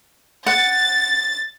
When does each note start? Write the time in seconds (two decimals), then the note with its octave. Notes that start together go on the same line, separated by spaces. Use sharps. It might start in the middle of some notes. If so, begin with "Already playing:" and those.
0.46 F#5 A6